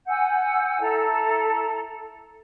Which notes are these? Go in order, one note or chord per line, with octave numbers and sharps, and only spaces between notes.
F#5 G#5 E6 G6
E4 A4 A5 A#5